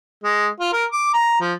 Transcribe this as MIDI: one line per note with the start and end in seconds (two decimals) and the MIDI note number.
0.24 0.47 56
0.60 0.73 65
0.73 0.85 70
0.92 1.12 86
1.14 1.36 82
1.41 1.53 53